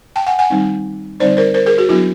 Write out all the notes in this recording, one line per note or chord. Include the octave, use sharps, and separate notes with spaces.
G5 A5
F#5 G#5
F#5 G#5
D#3 G3 C4 D#4
D3 G3 C4 D#4 C5 D5
A#4 C5
A#4 C5
G#4 A#4
F#4 G#4
F#3 B3 D4 E4 F#4